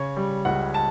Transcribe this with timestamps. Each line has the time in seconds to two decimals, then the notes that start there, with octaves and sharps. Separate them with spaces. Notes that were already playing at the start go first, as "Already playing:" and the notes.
Already playing: C#3 C#5
0.17 G3
0.45 C#2 F#5
0.74 A5